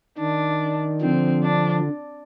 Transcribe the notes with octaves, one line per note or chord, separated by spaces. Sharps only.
D#3 D4
D3 F3 C4
D4